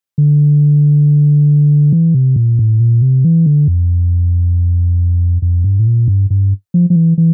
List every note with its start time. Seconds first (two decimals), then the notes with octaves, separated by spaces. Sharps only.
0.18 D3
1.93 E3
2.15 C3
2.36 A#2
2.59 A2
2.80 A#2
3.02 C3
3.25 E3
3.46 D3
3.68 F2
5.42 F2
5.64 G2
5.79 A2
5.87 A#2
6.08 G2
6.30 G2
6.74 F3
6.90 F3
6.96 E3
7.18 E3